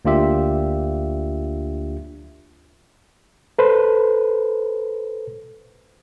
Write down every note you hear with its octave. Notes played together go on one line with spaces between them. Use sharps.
D2 A#3 D4 F4 G4 E5
A4 B4 C5